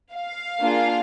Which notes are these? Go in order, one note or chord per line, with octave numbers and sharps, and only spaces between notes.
F5
A#3 D4 F4 G#4